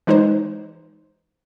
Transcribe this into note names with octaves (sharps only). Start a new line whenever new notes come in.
E3 G#3 D#4 B4 C5